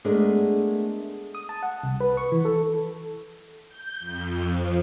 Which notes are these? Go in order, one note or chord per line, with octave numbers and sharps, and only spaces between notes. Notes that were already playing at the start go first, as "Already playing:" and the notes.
G#3 A3 B3 D4 G#4 A#4
D#6
A5
F#5
C2
B4
C#6
E3
A4
G6
F2
F3